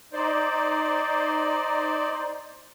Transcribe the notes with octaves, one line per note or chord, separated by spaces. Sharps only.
D#4 C5 D5